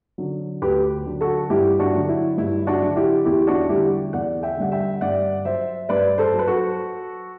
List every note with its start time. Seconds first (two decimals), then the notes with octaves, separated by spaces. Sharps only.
0.18 D3 F#3
0.62 D2 G4 B4
1.06 D3 F#3
1.21 F#4 A4
1.50 G2 E4 G4
1.79 D4 F#4
1.94 D3 F#3
2.09 E4
2.37 G2 E4
2.67 D4 F#4
2.82 D3 F#3
2.96 E4 G4
3.25 E2 E4 G4
3.47 D4 F#4
3.69 D3 G3 E4 G4
4.13 E2 D5 F#5
4.43 E5 G5
4.57 D3 G3 F#5
4.72 E5 G5
5.01 G2 D5 F#5
5.45 F#3 C5 E5
5.89 G2 B4 D5
6.18 A4 C5
6.33 F#3
6.39 B4
6.47 F#4 A4